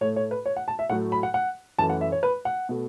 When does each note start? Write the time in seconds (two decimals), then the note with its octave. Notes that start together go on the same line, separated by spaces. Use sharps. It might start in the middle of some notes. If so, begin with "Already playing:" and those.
0.01 A2 A3 C#5
0.16 C#5
0.31 B4
0.46 C#5
0.56 F#5
0.68 A5
0.79 E5
0.90 A2 F#3 A3 F#5
1.12 B5
1.23 F#5
1.34 F#5
1.79 F#2 E3 A3 A5
1.90 F#5
2.01 E5
2.12 C#5
2.23 B4
2.45 F#5
2.69 B2 A3